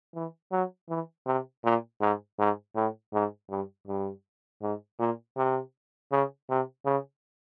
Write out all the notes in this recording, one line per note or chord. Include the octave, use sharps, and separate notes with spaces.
E3
F#3
E3
C3
A#2
G#2
G#2
A2
G#2
G2
G2
G#2
A#2
C3
C#3
C3
C#3